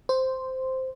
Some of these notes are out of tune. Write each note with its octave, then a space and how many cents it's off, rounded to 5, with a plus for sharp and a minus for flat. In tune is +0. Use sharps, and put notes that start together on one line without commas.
C5 -5